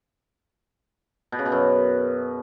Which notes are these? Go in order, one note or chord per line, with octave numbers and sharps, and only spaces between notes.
B2
C#3
B2
F#2